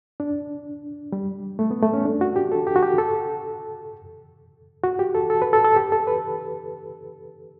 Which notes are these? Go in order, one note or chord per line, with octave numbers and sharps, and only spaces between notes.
D4
G3
A3
B3
A3
C#4
D4
F#4
G4
A4
G4
F#4
G4
A4
F#4
G4
A4
A4
B4
A4
A4
G4
A4
B4